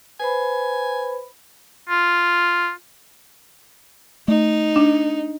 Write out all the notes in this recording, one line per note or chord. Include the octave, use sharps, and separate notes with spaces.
B4 C5 G#5 B5
F4
A3 D#4
D4